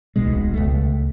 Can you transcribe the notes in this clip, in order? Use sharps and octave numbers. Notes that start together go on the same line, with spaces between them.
D1 B1 B2 G#3
C#2 A3